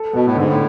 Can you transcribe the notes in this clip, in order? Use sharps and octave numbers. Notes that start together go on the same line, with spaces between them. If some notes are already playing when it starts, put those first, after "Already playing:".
Already playing: A4
B2 B3
A2
G#2 D3
A2